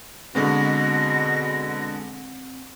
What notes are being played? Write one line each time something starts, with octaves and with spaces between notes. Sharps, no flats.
B2 D3 G#3 B3 C4 A#6